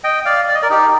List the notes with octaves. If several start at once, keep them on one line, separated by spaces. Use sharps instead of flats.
D#5 G5
D5 F5
D5
D#5
A#4 D5
D#4 G4